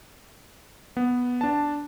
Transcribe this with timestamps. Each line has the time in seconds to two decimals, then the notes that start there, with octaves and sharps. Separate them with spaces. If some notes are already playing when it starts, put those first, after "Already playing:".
0.97 B3
1.41 D4 A5